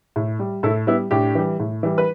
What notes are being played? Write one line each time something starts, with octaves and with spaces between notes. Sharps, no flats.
A2
G3
A2 E4 A4
G3 B3 E4
A2 D4 G4
E3 G3
A2
E3 G3
B4